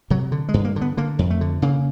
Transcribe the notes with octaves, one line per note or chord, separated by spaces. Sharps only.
C3 F#3
D3
G#3
G2
A#3
D3
B3
D3 A#3
F2
A3
D3
C#3 A#3